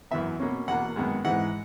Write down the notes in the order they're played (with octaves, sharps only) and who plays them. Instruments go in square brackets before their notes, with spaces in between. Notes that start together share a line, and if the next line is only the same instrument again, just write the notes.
[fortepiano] F#2 E3 B3 E5
B2 A#3 C#4
E2 B2 A#3 F#5
F#2 D#3 G#3 B3
G#2 E3 G#3 F#5